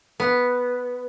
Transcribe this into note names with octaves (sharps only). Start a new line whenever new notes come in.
B3